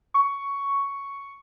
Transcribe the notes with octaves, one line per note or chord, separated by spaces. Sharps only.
C#6